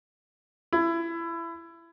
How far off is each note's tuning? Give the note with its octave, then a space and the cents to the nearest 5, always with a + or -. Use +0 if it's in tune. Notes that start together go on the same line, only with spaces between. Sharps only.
E4 +25